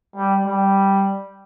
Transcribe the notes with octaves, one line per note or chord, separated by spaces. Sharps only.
G3
G3